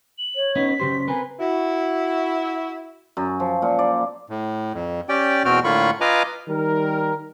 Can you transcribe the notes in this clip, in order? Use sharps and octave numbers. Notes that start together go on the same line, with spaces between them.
F#7
C#5
B3 C#4 D#4 B6
C#3 F#3 G4 C5
C4 A#4 B4 G#5
E4 F#4
F#2
F3
A#2
D5
A2
F2
C#4 G4 D5 G5
E2 B2 C4 F#4 G5 F6
A2 D3 A#3 F4 B5 C#6
F4 B4 D#5 G#5 A#5 D6
D#3 G3 A#4